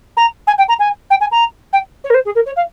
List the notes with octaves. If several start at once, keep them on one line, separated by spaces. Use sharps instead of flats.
A#5
G#5
G5
A#5
G#5
G5
G#5
A#5
G5
C#5
A#4
C5
G#4
A#4
C#5
F5